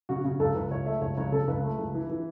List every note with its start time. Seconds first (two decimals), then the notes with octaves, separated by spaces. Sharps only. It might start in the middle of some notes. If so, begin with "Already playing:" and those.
0.09 C#3 F#4
0.24 C#3 F#4
0.40 C#2 A4
0.55 C#2 B4
0.71 C#2 C#5
0.86 A3 E5
1.01 C#2 C#5
1.17 C#2 C#5
1.32 C#3 A4
1.48 C#2 B4
1.63 A3
1.79 C#2
1.94 E3
2.09 E3